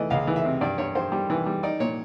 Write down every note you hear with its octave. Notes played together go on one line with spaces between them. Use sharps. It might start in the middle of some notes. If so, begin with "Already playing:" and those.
Already playing: E3 A3 D5 D#5
C#2 F5
E3
E5
C3
G2 D5
G2 C#5
G2 C5
G3
E3
G3
D#4 D5
A#2 C#5